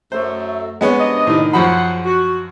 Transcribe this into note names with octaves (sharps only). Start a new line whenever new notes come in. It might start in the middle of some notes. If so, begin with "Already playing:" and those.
F#2 A3 C5
G#3 B3 C#4
C3 D4 D#5
A2 D#3
F#2 F3 G#4 C5 F#5 B5
F#4